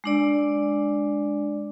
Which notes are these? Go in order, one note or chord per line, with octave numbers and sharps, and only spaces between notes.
G#3 D4 D5